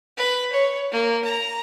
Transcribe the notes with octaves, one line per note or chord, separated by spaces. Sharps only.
B4
C#5
A#3
A#5